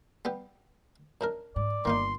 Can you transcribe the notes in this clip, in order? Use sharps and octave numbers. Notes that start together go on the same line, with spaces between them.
G3 B3 G4
F#2 D4 A#4
G#2 D5
G1 D#3 A#3 D#4 C6